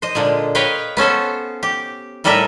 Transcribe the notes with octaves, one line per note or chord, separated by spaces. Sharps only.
C5 D#5
A#2 D3 G#3
B4 C#5 D#5 F5 G5
B3 C#4 A4 C5
G4
A2 G3 A4 A#4 D#5 E5